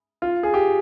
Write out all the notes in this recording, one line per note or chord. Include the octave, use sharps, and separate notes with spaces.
F4
G#4
G4